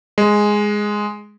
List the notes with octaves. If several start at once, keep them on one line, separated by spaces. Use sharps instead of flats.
G#3